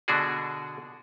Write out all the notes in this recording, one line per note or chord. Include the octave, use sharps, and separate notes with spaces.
B2 D3 D4 F#4 G#4